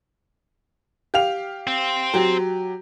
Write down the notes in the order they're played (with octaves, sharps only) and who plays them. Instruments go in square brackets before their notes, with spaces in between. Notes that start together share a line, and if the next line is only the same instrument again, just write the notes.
[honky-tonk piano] G4 F5 F7
[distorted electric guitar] C4
[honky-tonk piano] F#3 G4